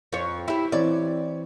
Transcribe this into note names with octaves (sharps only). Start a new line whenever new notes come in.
F2 C#5
E4 G4
E3 C4 C#5 D5